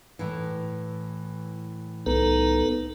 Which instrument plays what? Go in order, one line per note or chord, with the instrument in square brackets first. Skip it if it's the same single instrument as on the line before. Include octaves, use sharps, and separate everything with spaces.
[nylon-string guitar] A2 E3
[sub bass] C2 [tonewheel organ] B3 A4 B4 [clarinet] D#4